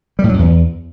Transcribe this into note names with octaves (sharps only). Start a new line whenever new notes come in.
G3
A2
F#3
F#2
E2